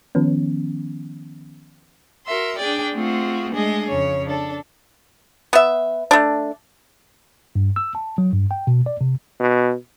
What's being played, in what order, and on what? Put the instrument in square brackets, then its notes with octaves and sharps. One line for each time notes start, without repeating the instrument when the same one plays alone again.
[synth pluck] D#3 F3 B3 C#4
[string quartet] F#4 A#4 E5 C6
D4 G#4 D5 G5
A3 C4 F4 F#4 G#4
G#3 A3 D4 G#4 D#5
F2 C#3 C#5
D4 A4
[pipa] B3 E5
A3 D4
[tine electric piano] G2
E6
A5
F#3
G2
G5
B2
D5
C3
[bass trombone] B2